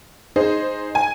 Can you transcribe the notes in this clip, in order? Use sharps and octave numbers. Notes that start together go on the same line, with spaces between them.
D#4 G#4 C5
G#5